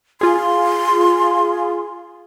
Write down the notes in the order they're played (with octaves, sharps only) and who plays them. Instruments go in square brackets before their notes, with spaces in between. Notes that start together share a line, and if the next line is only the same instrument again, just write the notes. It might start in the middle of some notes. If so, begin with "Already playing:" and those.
[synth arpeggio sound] F4 G#4 [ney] C6